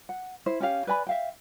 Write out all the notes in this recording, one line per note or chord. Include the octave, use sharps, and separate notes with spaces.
F#5
E4 C5
C#4 G4 F5
B4 D5 G#5 B5
E5 F5 G5